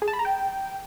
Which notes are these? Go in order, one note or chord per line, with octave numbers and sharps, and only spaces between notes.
G#4
A5
B5
A#5
G5